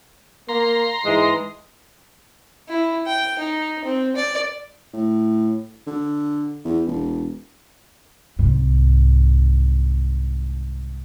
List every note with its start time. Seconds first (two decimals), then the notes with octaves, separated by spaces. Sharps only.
0.49 A#3 A#5 C6
1.06 G#2 E3 G#3
2.69 E4
3.07 G5
3.39 D#4
3.85 C4
4.16 D5
4.93 A2
5.87 D3
6.65 E2
6.87 E1
8.39 C2 G#2